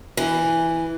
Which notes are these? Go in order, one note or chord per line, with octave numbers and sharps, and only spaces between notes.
E3